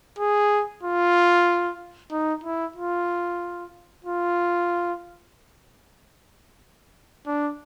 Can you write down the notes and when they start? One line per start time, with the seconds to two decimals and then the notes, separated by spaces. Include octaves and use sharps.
0.19 G#4
0.83 F4
2.11 D#4
2.44 E4
2.76 F4
4.05 F4
7.27 D4